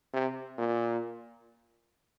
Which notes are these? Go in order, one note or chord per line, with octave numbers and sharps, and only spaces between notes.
C3
A#2